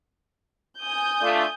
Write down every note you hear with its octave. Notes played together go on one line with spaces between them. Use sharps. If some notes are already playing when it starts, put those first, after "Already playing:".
G#5 D#6 G6
A3 D4 F4